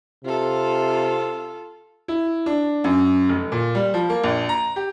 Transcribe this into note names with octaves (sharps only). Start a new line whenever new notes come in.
C3 F4 A4
E4
D4
F#2
F1
A#2
G3
F3
A#3
A#1
A#5
G4